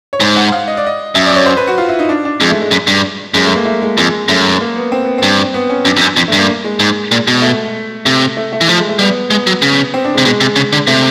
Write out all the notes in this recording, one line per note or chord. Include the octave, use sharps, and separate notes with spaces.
C#5
G#2 C5
F#5
F5
D#5
D5
D#5
F#2 E5
D5
C#5
C5
B4
F#4
F4
E4
D#4
D4
D4
F2 G#3
A3
G#3
F#2
G2
F#2 G#3
A3
A#3
A3
G#3
F2 G#3
F#2 A3
A#3
B3
C4
B3
G2 C4
B3
C#4
F#2 D4
F2
F#2
F2
G2 A3
A#3
G#3
G#2
A#2
B2
A3
C3 A3
A3
A3
E3
F3 A3
G#3
A3
G3 B3
G#3 B3
F#3
C#3
C4
D4
G#3
C3
B2 G#3
C3
C#3
D3
C3 A3